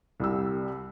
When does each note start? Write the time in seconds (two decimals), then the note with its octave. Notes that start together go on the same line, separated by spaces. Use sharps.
0.20 C2 G3 E6